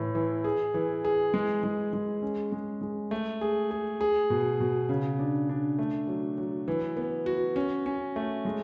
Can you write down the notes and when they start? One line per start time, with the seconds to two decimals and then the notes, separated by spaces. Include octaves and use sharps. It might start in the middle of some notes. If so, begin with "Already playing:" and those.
Already playing: A2 E3 E4
0.15 E3
0.44 G#4
0.74 E3
1.04 G#4
1.34 G#3
1.63 G#3
1.93 G#3
2.22 C#4
2.52 G#3
2.81 G#3
3.11 A3
3.41 G#4
3.71 G#4
4.01 G#4
4.30 B2
4.60 B2
4.89 C#3
5.19 D4
5.49 D4
5.79 A3
6.07 F#3
6.38 F#3
6.68 E3
6.97 B3
7.26 F#4
7.56 C#4
7.86 C#4
8.16 A3
8.45 G#3